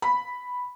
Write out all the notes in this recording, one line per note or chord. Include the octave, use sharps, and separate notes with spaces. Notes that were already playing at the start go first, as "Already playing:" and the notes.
B5